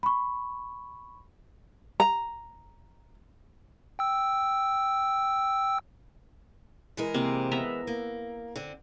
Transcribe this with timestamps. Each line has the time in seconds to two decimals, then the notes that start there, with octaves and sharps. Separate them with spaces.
0.03 B5 C#6
2.00 A#5
3.99 G5 E6
6.97 E3 G#3 A#4
7.14 C3 A#3 C4
7.51 B3 E5 A#5
7.87 A#3
8.56 D3 C4